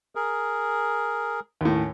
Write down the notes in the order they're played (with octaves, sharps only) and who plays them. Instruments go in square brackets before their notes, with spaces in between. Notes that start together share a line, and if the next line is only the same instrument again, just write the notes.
[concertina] G#4 A#4
[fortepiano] D#2 A2
[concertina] C#4